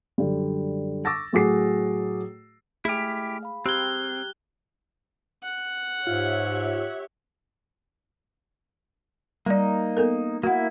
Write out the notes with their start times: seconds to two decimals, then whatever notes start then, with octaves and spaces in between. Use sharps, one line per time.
0.18 F#2 D3 G3
1.05 C#6 D6 E6 A6 A#6
1.33 A2 F#3 F#4 G#4 D6 C7
2.85 A3 E4 G4 G#4 F6
3.43 F5 B5
3.66 C4 G4 A#5 F6 F#6 G#6 G7
5.43 F#5
6.07 G#2 F4 G4 C#5 E5
9.46 G3 A#3 D#4 D5
9.97 B3 A4 A#4
10.43 A#3 E4 F#4 F#5